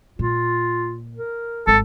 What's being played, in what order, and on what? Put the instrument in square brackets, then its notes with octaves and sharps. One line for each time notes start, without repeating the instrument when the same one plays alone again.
[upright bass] A#2 [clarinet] F4
[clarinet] A#4
[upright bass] G#1 [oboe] A4